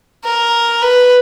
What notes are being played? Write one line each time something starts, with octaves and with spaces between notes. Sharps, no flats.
A#4
B4